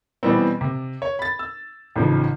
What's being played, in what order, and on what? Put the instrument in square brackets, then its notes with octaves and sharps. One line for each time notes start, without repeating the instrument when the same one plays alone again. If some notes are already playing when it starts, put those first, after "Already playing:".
[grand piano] B2 E3 G3 B3 C4
C3
C#5
B5 A6
E6
A1 G#2 C#3 F3